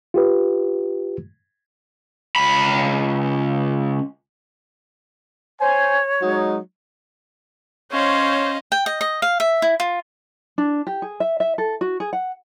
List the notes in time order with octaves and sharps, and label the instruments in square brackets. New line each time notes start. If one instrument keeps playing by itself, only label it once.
[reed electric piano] F4 G4 B4
[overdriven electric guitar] C#2 B5
[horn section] C5 G#5 [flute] C#5
[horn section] F#3 G#3 D#4
[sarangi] C#4 [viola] C5 [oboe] C#5 [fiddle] D#5 F5
[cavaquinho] G5
D#5
D#5
F5
E5
E4
F4
[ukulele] D4
G4
G#4
E5
E5
A4
F#4
G#4
F#5